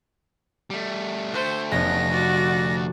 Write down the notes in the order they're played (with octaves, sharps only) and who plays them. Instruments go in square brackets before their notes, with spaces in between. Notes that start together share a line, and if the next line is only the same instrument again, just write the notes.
[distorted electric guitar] G3 A3
[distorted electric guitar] D2 A3 [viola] C5
[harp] F1 [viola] B3 C#4 [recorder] A#6
[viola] F#4 D5